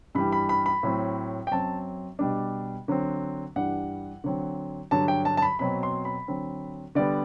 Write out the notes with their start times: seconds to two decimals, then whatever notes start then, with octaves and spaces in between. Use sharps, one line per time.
0.15 G2 E3 G3 B5
0.32 B5
0.49 B5
0.66 B5
0.83 A2 F#3 C4
1.47 G5
1.51 F#2 F#3 C4 A5
2.19 B2 G3 D4
2.88 D3 F#3 C4
3.56 G2 E3 G3 D4 F#5
4.24 D3 F#3 C4
4.91 G2 D3 F#3 A5
5.08 G5
5.25 A5
5.37 A5
5.42 B5
5.59 B2 F#3 C4 B5
5.83 C6
6.05 B5
6.28 D3 F#3 C4
6.95 D3 G3 B3 D5